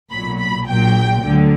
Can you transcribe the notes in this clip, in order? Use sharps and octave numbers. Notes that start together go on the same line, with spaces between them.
B1 A#2 F#3 B5
B5
A#1 A#2 F#3 G5
D2 D3 F#3